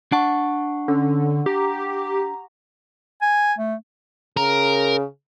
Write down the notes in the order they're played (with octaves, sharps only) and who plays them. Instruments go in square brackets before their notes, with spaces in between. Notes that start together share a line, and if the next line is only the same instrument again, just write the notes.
[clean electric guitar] D4 A5 [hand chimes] F#5 C#6
[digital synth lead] D3 [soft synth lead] C#4
[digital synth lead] G4 [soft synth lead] A#5
[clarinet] G#5
A3
[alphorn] C#3 [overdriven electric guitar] A#4